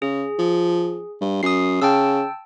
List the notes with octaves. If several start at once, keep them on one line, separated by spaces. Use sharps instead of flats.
C#3 G#4
F3
G2
F#2 D#6 C7
C#3 G5 A5 E6